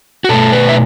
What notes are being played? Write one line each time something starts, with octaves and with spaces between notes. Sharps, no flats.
F#4
B2 A3 A4
B4
E5